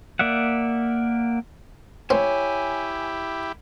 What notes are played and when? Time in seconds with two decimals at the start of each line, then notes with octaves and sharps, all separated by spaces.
0.19 A#3 D5 E5 F#5
2.10 C4 E4 G4 C#5 G#5